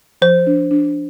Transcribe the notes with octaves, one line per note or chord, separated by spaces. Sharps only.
F3 C5
D4
D4